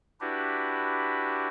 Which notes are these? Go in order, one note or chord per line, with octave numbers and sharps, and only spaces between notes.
D4 E4 F#4 G4 B4